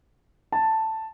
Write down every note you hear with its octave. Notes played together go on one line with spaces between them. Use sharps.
A5